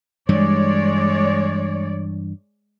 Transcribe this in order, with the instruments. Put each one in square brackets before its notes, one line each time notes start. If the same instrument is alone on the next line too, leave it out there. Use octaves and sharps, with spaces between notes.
[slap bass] G2 E3 G3 [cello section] G#3 C#5 D5